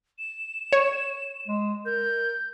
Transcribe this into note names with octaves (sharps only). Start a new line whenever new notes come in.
E7
C#5
G#3
A#4 G6